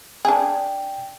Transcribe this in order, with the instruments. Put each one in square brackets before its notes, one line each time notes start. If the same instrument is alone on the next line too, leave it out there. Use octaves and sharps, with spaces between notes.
[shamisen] D4 G#4 [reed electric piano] G5